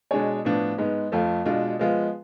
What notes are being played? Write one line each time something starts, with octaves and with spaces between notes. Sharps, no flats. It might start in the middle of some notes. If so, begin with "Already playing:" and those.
B2 G#3 D4 G#4 C#5
A2 F3 B3 D4
G#2 G#3 B3
F2 F3 A3 F4
B2 G#3 D4 F4
F3 G#3 B3 F4